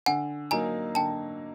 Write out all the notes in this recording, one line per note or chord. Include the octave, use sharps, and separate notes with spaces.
D3 F#5 G#5
F#3 A#3 D#4 G#5 A#5
D3 G5 A5